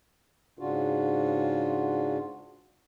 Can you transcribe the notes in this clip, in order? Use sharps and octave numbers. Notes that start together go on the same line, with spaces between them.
G#2 C#3 D4 F4 F#4